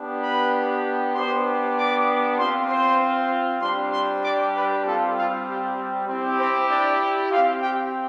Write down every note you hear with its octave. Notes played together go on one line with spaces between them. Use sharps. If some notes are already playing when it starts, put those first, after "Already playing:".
Already playing: B3 D4 G4
B4 B5
B3 D4 G4 C5 C6
D5 D6
C4 F4 C5 C6
C5 C6
G3 D4 G4 C5 C6
C5 C6
D5 D6
B4 B5
G3 C4 F4 A4 A5
F4 F5
G4
C4 E4 G4
C4 C5
D4 D5
C4 F4 G4 F5
G4 G5